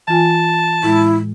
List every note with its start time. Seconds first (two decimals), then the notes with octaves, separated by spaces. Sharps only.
0.08 E3 F4 G#5 A5
0.83 A2 G#3 E4